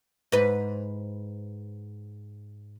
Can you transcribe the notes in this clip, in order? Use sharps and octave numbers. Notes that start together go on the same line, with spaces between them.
G#2 B4